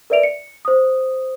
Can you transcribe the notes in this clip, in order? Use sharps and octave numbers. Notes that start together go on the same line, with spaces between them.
A#4 B4 D5 E5 D7 F7
C#7
C5 D#6